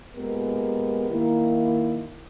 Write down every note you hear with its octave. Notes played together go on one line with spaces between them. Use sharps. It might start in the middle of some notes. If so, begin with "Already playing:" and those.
A#2 G#3 B3 G4 A#4
D#3 A#3 E4